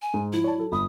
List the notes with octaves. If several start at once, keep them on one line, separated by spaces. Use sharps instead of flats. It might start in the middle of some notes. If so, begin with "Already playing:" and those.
G#5
G#2
F3 E4
C#5 D5 A5
F#3 A4
G1 B5 D#6